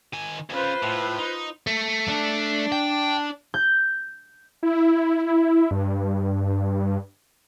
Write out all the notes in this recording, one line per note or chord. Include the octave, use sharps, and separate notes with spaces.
D#3 G#5
D2 C#3 F4 B4 C5
A2
D#4
A3
D4
G5
G6
E4
G2